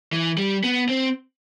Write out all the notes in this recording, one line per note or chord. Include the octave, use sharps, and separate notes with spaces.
E3
G3
B3
C4